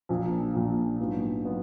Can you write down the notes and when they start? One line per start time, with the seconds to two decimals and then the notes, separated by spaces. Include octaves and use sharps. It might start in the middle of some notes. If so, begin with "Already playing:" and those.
0.09 A#1 A#2 F3
0.54 A#1 A#2 F3
0.99 A#1 G#2 F#3 B3 F4
1.44 F#3 B3 F4